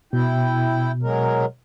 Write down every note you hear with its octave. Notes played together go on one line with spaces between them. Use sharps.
B2 E4 G5
F#3 G#3 A#4